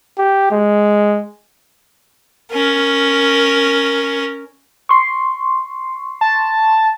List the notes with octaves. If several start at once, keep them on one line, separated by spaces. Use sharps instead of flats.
G4
G#3
C#4 A#4
C6 C#6
A5